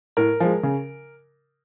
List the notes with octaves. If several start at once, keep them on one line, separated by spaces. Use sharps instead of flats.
A2 A#4
F3 G#3
C#3